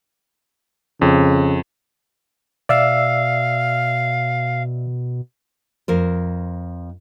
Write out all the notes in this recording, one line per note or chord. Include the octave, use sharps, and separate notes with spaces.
F2 C#3
B2 D5 E5 F5 E6
F2 A#4 C5